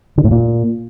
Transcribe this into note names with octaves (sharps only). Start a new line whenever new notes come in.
D3
A2
A#2